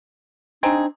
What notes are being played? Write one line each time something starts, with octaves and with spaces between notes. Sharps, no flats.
C4 D4 D#4 G#4